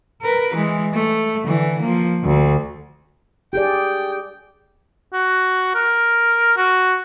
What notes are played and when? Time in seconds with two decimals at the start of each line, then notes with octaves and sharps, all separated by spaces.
0.22 A#4 B4
0.54 E3 G#3
0.94 A3
1.44 D3 E3
1.81 F3 A#3
2.24 D2
3.53 G4 G#4 D5 G5
5.13 F#4
5.75 A#4
6.57 F#4